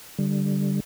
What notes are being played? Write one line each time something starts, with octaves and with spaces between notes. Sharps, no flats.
D3 G3